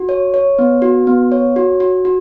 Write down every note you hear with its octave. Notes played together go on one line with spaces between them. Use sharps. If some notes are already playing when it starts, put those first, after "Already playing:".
Already playing: F#4
C#5
C#5
B3
F#4
B3
C#5
F#4
F#4
F#4